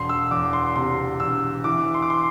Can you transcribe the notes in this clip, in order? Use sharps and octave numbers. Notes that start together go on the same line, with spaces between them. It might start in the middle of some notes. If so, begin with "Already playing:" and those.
Already playing: E1 C6
E6
E2 D6
C6
C3 C6
E1 E6
E3 D6
C6
D6
C6